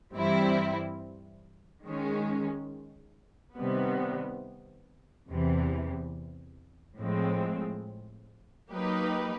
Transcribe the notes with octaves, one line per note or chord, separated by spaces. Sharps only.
G2 E3 G3 C4 E4
D#3 G#3 C#4
C3 D#3 G3 B3
E2 C3 E3
A2 F3 G#3 C4
F#3 A#3 D#4 G4 B4